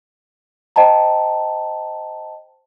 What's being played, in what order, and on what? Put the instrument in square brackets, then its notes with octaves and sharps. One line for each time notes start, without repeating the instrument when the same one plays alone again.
[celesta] C5 D#5 G5 A5 A#5